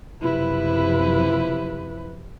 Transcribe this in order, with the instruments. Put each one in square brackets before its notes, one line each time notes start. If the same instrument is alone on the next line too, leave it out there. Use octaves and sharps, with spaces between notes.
[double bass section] F#1 C3 F3 [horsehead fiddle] E4 B4